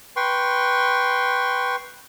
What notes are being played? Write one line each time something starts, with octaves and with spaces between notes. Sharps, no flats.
B4 G5 C6 C#6